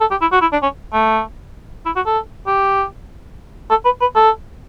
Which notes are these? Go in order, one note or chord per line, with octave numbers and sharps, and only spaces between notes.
A4
G4
E4
F#4
E4
D4
C#4
A3
E4
F#4
A4
G4
A4
B4
B4
A4